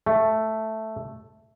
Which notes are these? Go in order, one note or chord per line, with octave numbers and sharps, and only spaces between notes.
A3